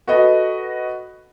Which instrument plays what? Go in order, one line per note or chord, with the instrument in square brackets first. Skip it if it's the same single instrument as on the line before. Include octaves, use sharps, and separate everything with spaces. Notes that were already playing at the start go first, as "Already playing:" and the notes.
[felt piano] F#4 A4 B4 D#5 F#5 B5